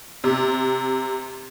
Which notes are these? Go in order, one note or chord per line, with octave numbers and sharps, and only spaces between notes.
C3